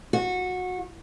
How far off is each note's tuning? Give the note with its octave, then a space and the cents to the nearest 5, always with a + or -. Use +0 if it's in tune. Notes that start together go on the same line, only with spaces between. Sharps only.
F#4 -20